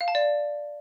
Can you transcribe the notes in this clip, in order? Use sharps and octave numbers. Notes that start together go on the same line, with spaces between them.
F5
A5
D5